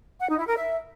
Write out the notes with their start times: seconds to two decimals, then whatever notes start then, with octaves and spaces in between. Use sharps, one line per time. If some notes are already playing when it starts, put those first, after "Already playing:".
0.19 F#5
0.29 D#4
0.38 E4
0.47 A#4
0.57 E5